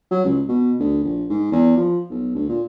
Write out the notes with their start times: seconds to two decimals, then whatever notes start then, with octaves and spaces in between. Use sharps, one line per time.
0.11 F#3
0.25 C#2
0.49 B2
0.80 D2
1.04 A#1
1.30 G#2
1.52 E2
1.77 F3
2.10 B1
2.35 D2
2.49 A#2